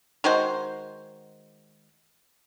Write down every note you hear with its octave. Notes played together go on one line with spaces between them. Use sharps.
D#3 G#3 F#4 C5